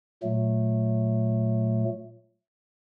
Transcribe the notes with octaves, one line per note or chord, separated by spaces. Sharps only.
A#2 F#3 A3